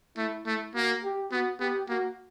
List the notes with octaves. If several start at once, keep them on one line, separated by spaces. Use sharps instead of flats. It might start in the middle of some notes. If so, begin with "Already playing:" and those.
A3 E4
A3 E4
A#3 F#4
G4
B3 F#4
B3 G4
A#3 F#4